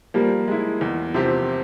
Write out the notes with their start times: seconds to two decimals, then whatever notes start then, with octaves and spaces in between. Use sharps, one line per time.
0.14 F3 G3 A#3
0.48 G#3 E4
0.81 E2
1.14 C3 F3 C4 G4